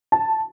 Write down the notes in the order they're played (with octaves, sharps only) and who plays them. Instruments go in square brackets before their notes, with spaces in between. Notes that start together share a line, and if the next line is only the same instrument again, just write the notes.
[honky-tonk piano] A5